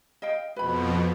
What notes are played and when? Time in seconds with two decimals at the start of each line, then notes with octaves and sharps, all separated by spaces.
0.22 D#5 F5 G5
0.56 F2 B2 B4 B5